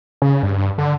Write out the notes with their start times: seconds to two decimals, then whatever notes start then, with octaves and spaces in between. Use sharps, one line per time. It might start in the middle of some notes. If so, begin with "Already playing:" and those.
0.22 C#3
0.43 G2
0.78 D3